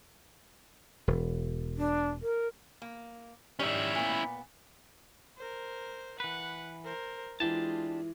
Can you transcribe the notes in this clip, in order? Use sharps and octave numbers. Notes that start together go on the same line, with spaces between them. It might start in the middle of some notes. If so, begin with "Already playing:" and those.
E1
D4
A#4
A#3
D#3 G3 C#4 E4
A#2 B3
A#4 C5
E3 B4 F#5
A#4 C5
E3 G#3 D4 F4 G4 A5